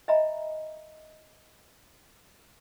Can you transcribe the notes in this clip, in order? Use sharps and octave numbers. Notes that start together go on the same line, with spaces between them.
D#5 E5 G#5 A#5 B5